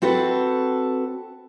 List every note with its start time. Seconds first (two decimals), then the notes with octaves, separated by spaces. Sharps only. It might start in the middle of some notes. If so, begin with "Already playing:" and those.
0.02 C4 F#4 A4 B4